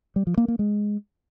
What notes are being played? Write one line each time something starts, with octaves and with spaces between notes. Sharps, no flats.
G3
F3
A#3
A#3
G#3